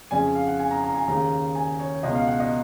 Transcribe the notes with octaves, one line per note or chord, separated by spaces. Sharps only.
F2 C#3 G#5
F5
F#5
G#5
A#5
A#5
G#5
D#2 C#3 A#5
G#5
C#5
C#2 B2 D#5
F5
F#5
D#5